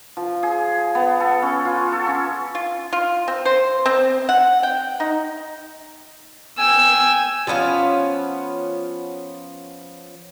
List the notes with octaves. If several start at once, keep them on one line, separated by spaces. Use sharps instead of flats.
F3
G#4
B3
A4
C#4
F4
A4
C#4
F4
F4
C4
C5
C4
F#5
G5
D#4
G5 G#5 E6
F3 B3 C#4 F5